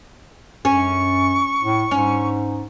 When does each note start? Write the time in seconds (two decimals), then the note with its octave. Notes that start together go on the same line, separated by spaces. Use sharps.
0.65 F#2 C#4 C#6
1.63 A2
1.91 G#2 C#4